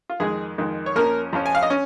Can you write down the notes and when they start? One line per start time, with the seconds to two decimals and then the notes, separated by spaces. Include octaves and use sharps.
0.10 F4
0.20 F2 D#3 G#3 G#4
0.58 F2 D#3 G#3
0.86 C#5
0.95 F2 F3 A#3 C#4 A#4
1.33 F2 F3 C#4
1.46 G#5
1.55 F5
1.63 D#5
1.70 C#4